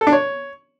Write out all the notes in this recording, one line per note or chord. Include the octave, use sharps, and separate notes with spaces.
A4
D4
C#5